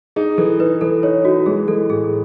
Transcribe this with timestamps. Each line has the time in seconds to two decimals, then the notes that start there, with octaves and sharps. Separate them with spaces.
0.16 D#4 G#4
0.38 E3 A4
0.60 D#4 B4
0.81 E3 A4
1.03 D#4 C#5
1.25 D#4 F#4
1.46 G#3 G#4
1.68 E3 A4
1.90 A2 G#4